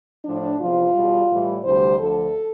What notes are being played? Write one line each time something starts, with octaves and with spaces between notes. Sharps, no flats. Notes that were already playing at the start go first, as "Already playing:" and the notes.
A2 F3 D4
E2 C3 F3 F4
E2 B2 G3
A2 E3 G3
D2 C3 E3 G3 C5
D2 D3 F3 A4